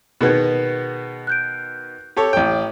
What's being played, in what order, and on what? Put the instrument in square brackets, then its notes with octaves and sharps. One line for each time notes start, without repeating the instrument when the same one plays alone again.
[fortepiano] B2 D#3 B3 [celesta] G#4 G#6
[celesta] F#6 G6 D7
[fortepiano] G4 A4 C#5
[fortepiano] A1 G5 [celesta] C#5